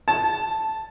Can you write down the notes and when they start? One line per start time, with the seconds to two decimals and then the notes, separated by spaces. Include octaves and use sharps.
0.08 A5